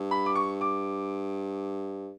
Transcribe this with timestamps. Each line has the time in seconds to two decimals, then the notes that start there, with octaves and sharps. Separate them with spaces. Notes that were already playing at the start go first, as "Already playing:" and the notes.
Already playing: G2
0.11 B5
0.26 D6
0.35 C#6
0.61 D6